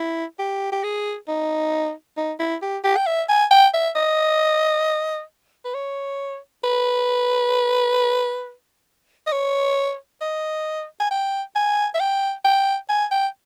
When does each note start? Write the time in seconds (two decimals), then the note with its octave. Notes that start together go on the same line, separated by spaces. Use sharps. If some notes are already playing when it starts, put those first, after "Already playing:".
Already playing: E4
0.39 G4
0.72 G4
0.84 G#4
1.28 D#4
2.17 D#4
2.40 E4
2.62 G4
2.84 G4
2.97 G5
3.07 E5
3.29 G#5
3.51 G5
3.74 E5
3.96 D#5
5.65 B4
5.74 C#5
6.64 B4
9.27 D#5
9.32 C#5
10.21 D#5
11.00 G#5
11.11 G5
11.55 G#5
11.95 E5
12.00 G5
12.45 G5
12.90 G#5
13.11 G5